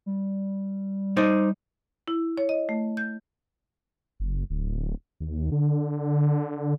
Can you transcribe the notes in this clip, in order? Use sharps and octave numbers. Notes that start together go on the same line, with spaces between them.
G3
D#4 C5 D5
E4
C#5
D#5
A3
G6
F#1
D1
D#2
D3